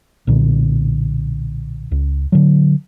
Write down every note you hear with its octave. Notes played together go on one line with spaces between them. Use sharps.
B1 A#2 D3
C#2
D3 F#3